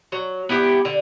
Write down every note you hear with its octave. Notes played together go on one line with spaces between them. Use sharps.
F#3
B3 E4 G4
D3